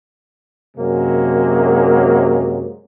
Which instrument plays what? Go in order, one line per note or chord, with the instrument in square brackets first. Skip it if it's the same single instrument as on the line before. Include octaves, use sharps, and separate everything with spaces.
[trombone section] F#2 C3 F#3 G#3 A#3